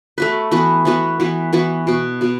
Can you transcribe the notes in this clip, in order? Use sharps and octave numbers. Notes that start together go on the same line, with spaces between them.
A3 F#4 B4
E3 B3 F#4 B4
E3 B3 F#4 B4
E3 B3 F#4 B4
E3 B3 F#4 B4
B2 B3 F#4
B2 B3 F#4